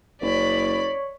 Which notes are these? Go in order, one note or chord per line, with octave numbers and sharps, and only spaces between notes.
F#1 C#5 D5 B5